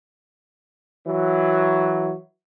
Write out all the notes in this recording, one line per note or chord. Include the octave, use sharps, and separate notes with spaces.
E3 F#3